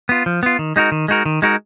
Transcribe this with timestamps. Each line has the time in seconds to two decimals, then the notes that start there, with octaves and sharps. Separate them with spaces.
0.09 B3 F4
0.26 F3
0.43 B3 F4
0.59 D#3
0.76 G#3 D#4 F#4 A#4
0.92 D#3
1.08 G#3 D#4 F#4 A#4
1.26 D#3
1.42 G#3 D#4 F#4 A#4